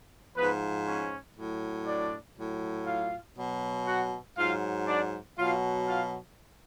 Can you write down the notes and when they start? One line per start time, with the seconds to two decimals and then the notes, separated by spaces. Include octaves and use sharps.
0.37 G#2 F3 B3 B4
0.87 C#4 C#5
1.37 A2 F#3
1.87 D4 D5
2.37 A2 F#3
2.87 F4 F5
3.37 B2 F#3
3.87 F#4 F#5
4.37 G#2 F#3 F4 F5
4.88 D4 D5
5.38 B2 F#3 F4 F5
5.88 F4 F5